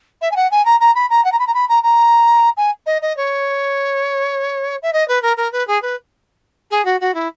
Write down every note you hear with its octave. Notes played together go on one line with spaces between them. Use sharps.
E5
G#5
F#5
G#5
A#5
A#5
B5
A#5
F#5
A#5
B5
A#5
B5
A#5
A#5
G#5
D#5
D#5
C#5
E5
D#5
B4
A#4
A#4
B4
G#4
B4
G#4
F#4
F#4
E4